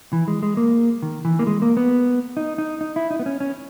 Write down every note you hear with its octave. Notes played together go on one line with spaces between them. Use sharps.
E3
G#3
G#3
A#3
D#3
E3
A#3
G#3
A#3
B3
D#4
D#4
D#4
E4
D#4
B3
C#4
C#4